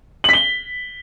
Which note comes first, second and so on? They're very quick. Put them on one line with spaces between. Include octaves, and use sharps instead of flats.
F#7 B6 G7